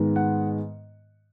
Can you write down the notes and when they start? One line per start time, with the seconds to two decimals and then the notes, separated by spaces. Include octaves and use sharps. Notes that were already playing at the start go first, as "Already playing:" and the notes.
Already playing: G#2 D#3 G#3 B3
0.16 F#5